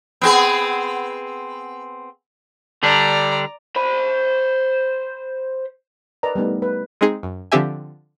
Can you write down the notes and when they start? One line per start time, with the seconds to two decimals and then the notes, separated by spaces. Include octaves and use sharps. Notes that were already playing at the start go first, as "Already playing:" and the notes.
0.21 B3 C4 G#4
2.83 D3 G3 D4 D5 A#5
3.76 C5 B5
6.23 A#4 B4 D5 D#5 A#5
6.35 G3 A3 B3 D#4
6.62 B4
7.01 G#3 C4 D#4 G#4
7.23 F#2
7.52 D3 F3 C4 G4 E5 G#5